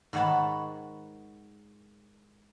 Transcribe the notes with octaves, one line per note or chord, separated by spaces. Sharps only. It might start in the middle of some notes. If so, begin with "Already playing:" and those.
G#2 D#3 C#5 F#5 A5 B5